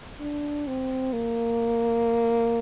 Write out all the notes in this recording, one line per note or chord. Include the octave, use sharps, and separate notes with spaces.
D4
C4
A#3